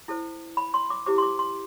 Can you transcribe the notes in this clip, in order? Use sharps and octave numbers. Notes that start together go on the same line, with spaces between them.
E4 A4 C5
B5
C6
D6
E4 G4 C5 D6
C6
D6
C6